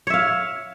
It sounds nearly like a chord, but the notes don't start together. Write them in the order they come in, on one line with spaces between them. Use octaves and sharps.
C#5 E5 F5